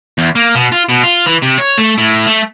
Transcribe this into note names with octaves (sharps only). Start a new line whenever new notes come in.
E2
A#3
B2
F4
B2
F4
E3
C3
C#5
A3
A2
A3